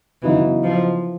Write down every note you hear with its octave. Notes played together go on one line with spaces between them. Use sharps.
C#3 E3 F#3 B3 D#4 F#4
F3